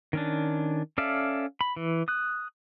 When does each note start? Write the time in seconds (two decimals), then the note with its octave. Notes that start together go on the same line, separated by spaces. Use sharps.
0.13 D#3 C#4 D4
0.98 C#4 A4 D5 E5 F5
1.61 B5
1.76 E3
2.08 D#6 F#6